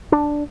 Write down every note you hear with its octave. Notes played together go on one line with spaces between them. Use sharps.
D4